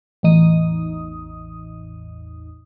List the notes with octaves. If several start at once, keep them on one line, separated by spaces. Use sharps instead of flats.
A1 E2 D#4 D#6